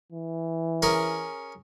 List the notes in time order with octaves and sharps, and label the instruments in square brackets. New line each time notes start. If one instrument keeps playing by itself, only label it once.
[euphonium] E3
[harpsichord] C#4 G#4 A#4